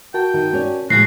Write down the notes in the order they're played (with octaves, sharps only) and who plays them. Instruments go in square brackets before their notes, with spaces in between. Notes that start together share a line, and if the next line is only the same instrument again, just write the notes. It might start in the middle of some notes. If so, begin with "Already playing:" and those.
[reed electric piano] F#4 A#4 A5 [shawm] G5
[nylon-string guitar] D#3
C#4 C#5 D5
[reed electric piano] A2 [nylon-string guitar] C#3 F3 G#3 [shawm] F#4 [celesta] C7